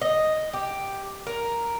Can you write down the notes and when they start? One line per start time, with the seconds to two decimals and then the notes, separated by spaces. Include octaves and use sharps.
0.01 D#5
0.53 G4
1.27 A#4